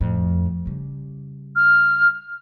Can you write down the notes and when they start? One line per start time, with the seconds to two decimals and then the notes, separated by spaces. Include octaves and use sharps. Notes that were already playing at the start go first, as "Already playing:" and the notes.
0.01 F2 A2
0.65 C#3 G3
1.56 F6